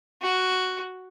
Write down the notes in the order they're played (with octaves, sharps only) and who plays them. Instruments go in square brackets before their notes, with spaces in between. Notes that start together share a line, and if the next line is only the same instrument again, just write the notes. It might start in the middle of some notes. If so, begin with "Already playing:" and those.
[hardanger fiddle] F#4